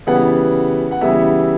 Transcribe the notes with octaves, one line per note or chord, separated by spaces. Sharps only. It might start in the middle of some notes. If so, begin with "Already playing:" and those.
C#3 E3 G3 B3 F#5
F#5
C#3 E3 G3 B3 E5